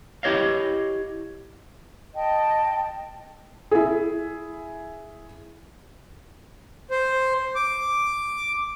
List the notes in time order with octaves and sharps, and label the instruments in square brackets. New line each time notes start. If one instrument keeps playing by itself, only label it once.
[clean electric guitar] E4 G4 C#5 D#5 F5
[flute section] D#5 G5 A5
[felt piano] E4 G#4
[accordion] C5
D6